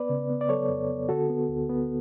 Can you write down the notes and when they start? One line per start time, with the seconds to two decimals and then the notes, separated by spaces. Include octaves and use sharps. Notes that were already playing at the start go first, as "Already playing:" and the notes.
Already playing: B3 B4 D5
0.10 C#3
0.30 B3
0.41 D5
0.49 F#3 A4 C#5
0.69 F2
0.90 B3
1.09 D3 F#4 A4
1.30 B3
1.49 D2
1.69 B3